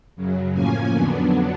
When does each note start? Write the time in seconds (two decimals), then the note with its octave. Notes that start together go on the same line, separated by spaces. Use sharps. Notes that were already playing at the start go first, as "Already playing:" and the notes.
0.16 F#2 C#3 F#3
0.53 A2 F3 A#3 C#4 G#5
0.92 F2 D3 F#3 B3 D4